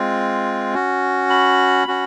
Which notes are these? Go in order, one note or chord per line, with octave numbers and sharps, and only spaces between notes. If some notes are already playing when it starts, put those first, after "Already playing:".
Already playing: G#3 C4 F4
C#4 F#4
B5
C#4 F#4